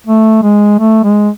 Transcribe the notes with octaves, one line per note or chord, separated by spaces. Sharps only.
A3
G#3
A3
G#3